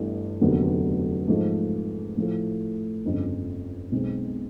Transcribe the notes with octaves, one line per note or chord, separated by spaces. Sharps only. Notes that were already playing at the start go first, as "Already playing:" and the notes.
Already playing: G1 G2 E3 A3
F1 D#2 D3 F#3 B3
G#2 F3 A3
A2 F3 A3
G1 F2 C#3
B1 B2 G#3 C4